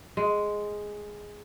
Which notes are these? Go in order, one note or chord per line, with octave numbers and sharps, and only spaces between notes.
G#3